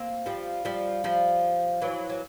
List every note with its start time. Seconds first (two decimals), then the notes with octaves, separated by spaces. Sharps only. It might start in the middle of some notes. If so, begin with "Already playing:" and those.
Already playing: A#3 C4
0.26 F3 G3
0.65 F3 G3
1.04 F3 G3
1.82 E3 F#3
2.10 F#3